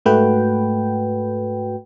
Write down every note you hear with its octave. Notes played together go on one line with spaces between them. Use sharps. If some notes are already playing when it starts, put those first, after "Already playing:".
G#2 A3 F#4 B4 G5